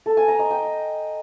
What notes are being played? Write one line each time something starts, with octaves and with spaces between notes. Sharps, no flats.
A4
G#5
A#5
D#5
G5